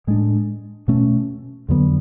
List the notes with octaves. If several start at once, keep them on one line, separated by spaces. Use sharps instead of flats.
A2 G#3 D4
B2 A3 C#4
F2 D3 F#3 B3